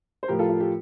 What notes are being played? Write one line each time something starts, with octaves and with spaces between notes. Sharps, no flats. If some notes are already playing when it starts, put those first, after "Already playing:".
C5
A2 F3 G4 A#4
F4 A4
F4
G4